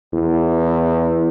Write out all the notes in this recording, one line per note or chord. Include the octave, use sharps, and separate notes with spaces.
E2